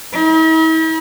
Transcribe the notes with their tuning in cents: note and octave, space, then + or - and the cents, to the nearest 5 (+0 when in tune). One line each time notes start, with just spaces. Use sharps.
E4 -45